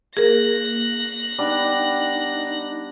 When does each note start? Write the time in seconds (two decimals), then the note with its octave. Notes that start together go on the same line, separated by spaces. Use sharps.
0.17 A#3 G#4 A#4 F#6 A#6
1.38 G3 B3 D4 D#4